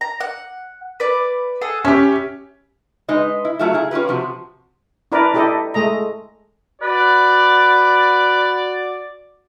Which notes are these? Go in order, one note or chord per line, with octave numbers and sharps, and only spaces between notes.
A#5
F#5
B4 D5
G#4 A4 F#5
C#4 E4 G4
G#3 D#4 B4 D#5
E4
F#3 A3 F4 G#4 E5
D#4 E4 G#4
C#4 F4 G4 B4
C3 F3 F#4
D4 E4 A#4 B4 D5
D4 E4 G4 A4 D#5
G#3 A3 D#5 A#5
F#4 B4 D5